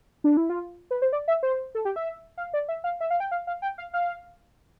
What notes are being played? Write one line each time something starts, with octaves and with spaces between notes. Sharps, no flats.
D4
E4
F4
B4
C5
D5
E5
C5
A4
G4
E5
F5
D5
E5
F5
E5
F5
G5
F5
F5
G5
F5
F5